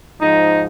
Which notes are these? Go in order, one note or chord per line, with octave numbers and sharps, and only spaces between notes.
G#2 F3 D#4